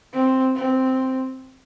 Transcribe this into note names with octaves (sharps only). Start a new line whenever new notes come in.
C4
C4